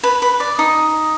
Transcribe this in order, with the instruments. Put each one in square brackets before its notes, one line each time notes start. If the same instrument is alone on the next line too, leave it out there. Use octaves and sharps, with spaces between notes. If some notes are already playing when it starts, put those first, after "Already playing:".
[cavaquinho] B4
B4
D5
D#4 D#5